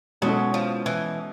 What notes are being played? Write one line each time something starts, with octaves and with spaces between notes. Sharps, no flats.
B2 F#3 G#3 C#4 E4 A4
F3
E3